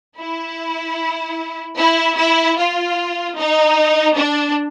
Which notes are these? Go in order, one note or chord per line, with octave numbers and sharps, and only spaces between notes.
E4
E4
E4
F4
D#4
D4